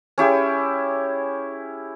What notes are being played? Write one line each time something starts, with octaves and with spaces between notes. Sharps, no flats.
C#4 E4 G4 G#4